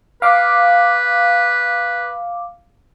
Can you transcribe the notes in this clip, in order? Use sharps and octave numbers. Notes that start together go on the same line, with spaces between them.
B4 F5 D6